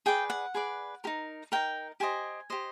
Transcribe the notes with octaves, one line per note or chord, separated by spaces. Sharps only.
G#4 B4 D5 G5
F#5
G#4 B4 D5
D#4 G4 A#4
D#4 G4 A#4 G5
G4 C5 D#5 G#5
G4 C5 D#5